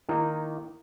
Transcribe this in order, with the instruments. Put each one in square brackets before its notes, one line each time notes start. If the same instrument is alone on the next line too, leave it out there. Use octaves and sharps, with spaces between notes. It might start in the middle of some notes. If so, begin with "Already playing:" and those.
[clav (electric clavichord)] D#3 A#3 D#4 [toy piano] E4